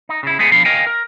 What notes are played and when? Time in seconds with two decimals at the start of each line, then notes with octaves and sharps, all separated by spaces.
0.09 D#4
0.23 C#3 E4
0.39 G#3 A3 B3 G#4
0.52 B2 D3 F3 D4 F5 B5
0.65 A#4 D#5 F5 G5 G#5
0.87 A#4